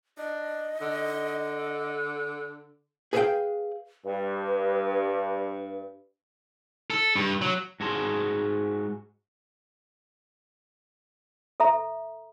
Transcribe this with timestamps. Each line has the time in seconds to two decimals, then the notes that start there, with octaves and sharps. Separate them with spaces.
0.18 D4 D#5
0.81 D3
3.13 G#4 B4 C#5 E5 F5 G5
4.05 G2 B4
6.90 A4
7.16 G2
7.42 F#3
7.80 G#2 F#4 G#4 A5 B5 C6
11.60 A4 E5 A#5